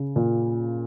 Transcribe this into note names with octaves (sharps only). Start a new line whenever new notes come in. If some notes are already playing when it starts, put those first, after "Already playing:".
Already playing: C#3
A#2